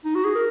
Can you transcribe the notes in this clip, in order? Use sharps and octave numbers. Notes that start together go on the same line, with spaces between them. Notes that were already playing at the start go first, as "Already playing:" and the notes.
D#4
F#4
G#4
A#4